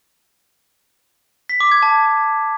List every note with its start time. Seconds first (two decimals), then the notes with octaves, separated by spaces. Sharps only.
1.49 B6
1.60 D6
1.71 G#6
1.83 A5